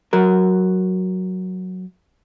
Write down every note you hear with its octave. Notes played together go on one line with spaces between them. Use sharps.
F#3 A#4